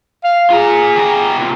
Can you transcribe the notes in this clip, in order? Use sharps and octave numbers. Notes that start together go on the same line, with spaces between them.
F5
F4 G#4 A#5
G3 A#5
C2 A#2